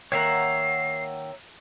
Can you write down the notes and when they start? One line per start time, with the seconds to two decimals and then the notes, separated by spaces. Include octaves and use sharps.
0.12 D#3 A#3 C#5 E5 F#5 A#5 C7